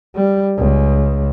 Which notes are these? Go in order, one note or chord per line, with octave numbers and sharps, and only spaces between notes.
G3
C#2